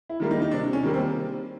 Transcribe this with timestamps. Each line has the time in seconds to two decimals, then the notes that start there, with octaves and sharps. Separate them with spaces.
0.10 E4
0.20 D#3 G3 A#3
0.31 D#4
0.42 D#4
0.51 C3 D4
0.73 C#4
0.83 D#3 G3 A#3
0.94 C4